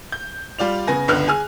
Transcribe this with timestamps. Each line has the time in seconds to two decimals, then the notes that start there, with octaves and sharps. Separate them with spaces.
0.12 G6
0.59 G3 F4 D5 F7
0.87 C#3 B3 G#5 A#6
1.08 G1 C#2 D3 B3 F6 F#6
1.28 G#4 G#5 F6